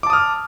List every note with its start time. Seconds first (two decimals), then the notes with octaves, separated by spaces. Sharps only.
0.03 D6
0.07 A5
0.10 D#6
0.13 F6